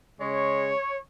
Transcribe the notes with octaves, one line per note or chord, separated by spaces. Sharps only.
C#3 G#3 C#5